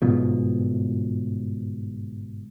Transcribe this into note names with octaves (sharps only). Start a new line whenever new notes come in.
G1 G#2 B2 F3